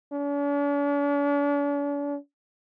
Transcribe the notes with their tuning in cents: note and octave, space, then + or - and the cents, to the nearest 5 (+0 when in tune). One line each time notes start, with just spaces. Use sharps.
D4 -45